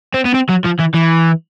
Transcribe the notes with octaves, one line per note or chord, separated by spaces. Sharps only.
C4
B3
C4
F#3
F3
E3
E3